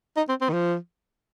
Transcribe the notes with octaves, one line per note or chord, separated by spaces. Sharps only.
D#4
C4
C4
D#3
F3